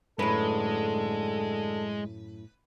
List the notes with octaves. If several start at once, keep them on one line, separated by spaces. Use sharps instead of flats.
F#2 A2 D3 G#3 A4 B4